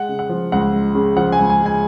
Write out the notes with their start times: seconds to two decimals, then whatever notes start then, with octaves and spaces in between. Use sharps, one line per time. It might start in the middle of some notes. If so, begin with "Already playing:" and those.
Already playing: G#3 F#5
0.09 C#3
0.19 F#5
0.29 F3
0.52 C#2 F#5
0.73 G#3
0.95 C#3
1.17 F3 F#5
1.32 G#5
1.39 C#2
1.50 G#5
1.60 G#3
1.66 G#5